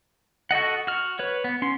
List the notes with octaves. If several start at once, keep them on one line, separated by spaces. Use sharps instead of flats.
F#4 A4 D#5 F#5
F#4 F6
B4 C#5
B3
C#4 C6